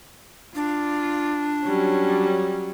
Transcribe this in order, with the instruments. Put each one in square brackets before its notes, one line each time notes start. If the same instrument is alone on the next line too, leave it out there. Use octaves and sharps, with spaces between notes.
[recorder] D4 [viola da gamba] F4
[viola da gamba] F#3 G3 C#4